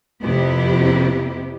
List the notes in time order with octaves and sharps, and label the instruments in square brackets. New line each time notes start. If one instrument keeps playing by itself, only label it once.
[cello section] F2 C3 B3 C4 E4 G4